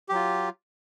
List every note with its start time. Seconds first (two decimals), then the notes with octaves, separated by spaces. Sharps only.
0.09 G4
0.12 F#3
0.15 F4